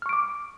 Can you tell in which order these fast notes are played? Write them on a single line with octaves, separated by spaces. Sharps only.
F6 C#6 D7 D6